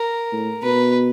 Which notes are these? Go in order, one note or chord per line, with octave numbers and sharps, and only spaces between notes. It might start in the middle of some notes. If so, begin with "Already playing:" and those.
Already playing: A#4
A2
B2 B4